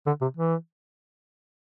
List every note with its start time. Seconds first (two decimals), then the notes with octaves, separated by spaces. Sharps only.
0.07 D3
0.21 C3
0.37 E3